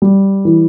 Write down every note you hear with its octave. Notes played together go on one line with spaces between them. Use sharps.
G3
E3